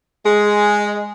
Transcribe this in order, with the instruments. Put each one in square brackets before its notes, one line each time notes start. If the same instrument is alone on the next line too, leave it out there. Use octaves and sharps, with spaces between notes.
[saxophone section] G#3